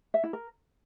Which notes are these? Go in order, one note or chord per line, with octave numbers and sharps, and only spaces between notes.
E5
E4
A#4